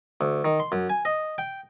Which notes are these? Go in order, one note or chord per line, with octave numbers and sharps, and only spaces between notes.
D2
D#3
C6
F#2
G#5
D#5
G5